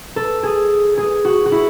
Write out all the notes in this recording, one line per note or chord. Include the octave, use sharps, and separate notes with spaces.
A4
G#4
G#4
F#4
F#4
E4